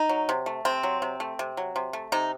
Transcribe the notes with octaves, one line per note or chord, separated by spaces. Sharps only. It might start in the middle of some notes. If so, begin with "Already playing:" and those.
Already playing: D#4
F#3
C3
A3
C3 C4
F#3
C3
A3
C3
F#3
C3
A3
C3 D#4